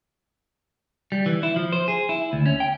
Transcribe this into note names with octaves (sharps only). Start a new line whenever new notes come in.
G3
E3
E4
F3
C5
G#4
E4
D2
C#4
G5